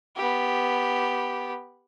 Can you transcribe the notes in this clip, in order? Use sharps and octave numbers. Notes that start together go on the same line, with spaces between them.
B3 G4